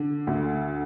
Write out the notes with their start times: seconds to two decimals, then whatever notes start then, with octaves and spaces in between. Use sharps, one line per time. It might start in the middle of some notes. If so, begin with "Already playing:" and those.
Already playing: D3
0.27 D2